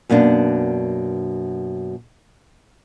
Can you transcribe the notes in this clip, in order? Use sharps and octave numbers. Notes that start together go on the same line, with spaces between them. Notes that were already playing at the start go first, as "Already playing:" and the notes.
F#2 B2 A#3 D4